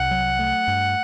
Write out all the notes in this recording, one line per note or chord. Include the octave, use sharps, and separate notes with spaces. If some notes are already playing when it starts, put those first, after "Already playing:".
Already playing: C2 F#5
F#3
A3
G2